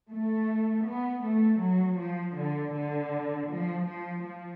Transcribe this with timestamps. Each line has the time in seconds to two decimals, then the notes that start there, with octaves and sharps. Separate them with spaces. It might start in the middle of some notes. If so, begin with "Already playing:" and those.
0.10 A3
0.86 B3
1.24 A3
1.61 F#3
1.98 F3
2.36 D3
2.74 D3
3.49 F3
3.86 F3
4.24 F3